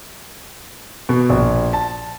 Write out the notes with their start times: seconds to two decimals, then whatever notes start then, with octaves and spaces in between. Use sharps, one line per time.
1.09 B2
1.29 A#1
1.73 A5